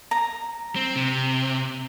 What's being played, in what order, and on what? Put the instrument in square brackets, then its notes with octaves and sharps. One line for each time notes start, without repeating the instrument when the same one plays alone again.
[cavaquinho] A#5
[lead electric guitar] C4
C3